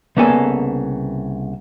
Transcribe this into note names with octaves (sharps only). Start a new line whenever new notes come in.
C2 C#3 A#3 B3 A4 G#5